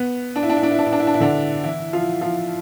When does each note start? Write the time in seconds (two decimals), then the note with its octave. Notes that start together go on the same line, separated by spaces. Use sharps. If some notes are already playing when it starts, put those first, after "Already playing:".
Already playing: B3
0.36 D4
0.43 E4
0.50 D4
0.57 E4
0.63 D4
0.71 E4
0.79 D4
0.86 E4
0.92 D4
1.00 E4
1.07 D4
1.14 E4
1.20 D3 D4
1.64 E3 E4
1.93 F3 F4
2.21 F3 F4